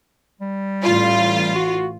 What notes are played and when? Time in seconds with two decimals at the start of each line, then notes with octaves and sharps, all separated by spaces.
0.41 G3
0.83 A1 F4
1.55 F#4